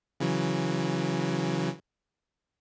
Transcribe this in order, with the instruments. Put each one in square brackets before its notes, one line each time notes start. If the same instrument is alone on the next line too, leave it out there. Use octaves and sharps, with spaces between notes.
[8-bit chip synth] C#3 E3 F#3